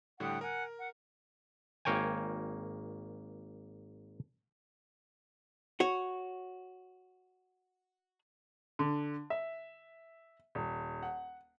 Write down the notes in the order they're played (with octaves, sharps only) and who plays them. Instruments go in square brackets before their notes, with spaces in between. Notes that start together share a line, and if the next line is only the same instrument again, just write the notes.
[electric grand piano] A2 D3 G3 [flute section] F#5 G5 D#6
[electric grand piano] A#4 [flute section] F#5 G#5
[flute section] F#5
[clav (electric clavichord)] G#1 A#3 C#5 G5 G#5
[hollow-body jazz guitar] F#4 C#5
[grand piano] D3
E5
D#1
F#5